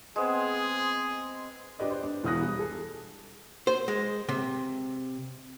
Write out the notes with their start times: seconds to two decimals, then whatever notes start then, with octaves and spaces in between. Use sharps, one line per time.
0.16 G#3 B3 C4 G#4
1.79 D4 G4 B4 D5 D#5
1.90 C5 D5
2.04 D4
2.24 E1 B2 E3 D#6 F#6 A#6
2.41 G3
2.59 G#4 A4
3.67 C5
3.88 G#3
4.29 C3